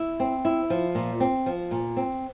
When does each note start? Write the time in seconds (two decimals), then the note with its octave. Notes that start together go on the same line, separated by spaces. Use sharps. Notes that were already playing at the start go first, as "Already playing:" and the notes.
Already playing: E4
0.20 C4
0.45 E4
0.70 F3
0.95 A#2
1.20 C4
1.46 F3
1.71 A#2
1.97 C4